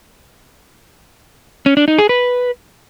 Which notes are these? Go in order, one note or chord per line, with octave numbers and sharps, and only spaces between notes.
C#4
D4
D#4
G#4
B4